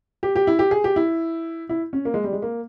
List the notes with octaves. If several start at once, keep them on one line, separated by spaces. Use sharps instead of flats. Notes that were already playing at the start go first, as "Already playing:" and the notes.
G4
G4
E4
G4
G#4
G4
E4
E4
C#4
A#3
G#3
G3
G#3
A#3